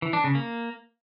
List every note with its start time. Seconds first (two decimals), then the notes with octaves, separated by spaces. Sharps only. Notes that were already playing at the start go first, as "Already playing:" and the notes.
0.02 E3
0.13 D4
0.24 C#3
0.35 A#3